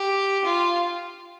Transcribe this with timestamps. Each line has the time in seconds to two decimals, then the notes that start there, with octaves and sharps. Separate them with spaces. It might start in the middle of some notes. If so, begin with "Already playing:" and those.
Already playing: G4
0.44 F4